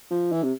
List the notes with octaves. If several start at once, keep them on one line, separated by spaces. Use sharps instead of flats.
F3
E3
C3